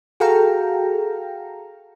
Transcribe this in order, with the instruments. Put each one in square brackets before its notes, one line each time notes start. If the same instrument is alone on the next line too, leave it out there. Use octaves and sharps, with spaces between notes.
[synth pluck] F#4 G#4 A4 F5 G5 A#5